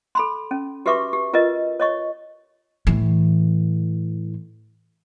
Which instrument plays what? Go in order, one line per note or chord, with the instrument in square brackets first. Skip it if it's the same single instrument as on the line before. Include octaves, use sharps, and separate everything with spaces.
[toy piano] A4 B5 C6
C#4
F#4 G4 B4 E5 C#6 D6
G4
F4 A#4 B4 D#5
C#5 D#5 C#6
[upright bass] A2 E3